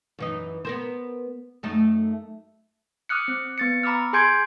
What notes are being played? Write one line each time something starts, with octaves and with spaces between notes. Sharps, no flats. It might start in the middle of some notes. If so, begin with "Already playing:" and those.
F#2 E3 D#4
B3 A#4 C5
F#2 A3 D#4
D6 D#6 F6 F#6 C#7
C4
B3 A6 C#7
A#5 B5 D6 E6 F6
G#4 G#5 C6 G6 G#6 D7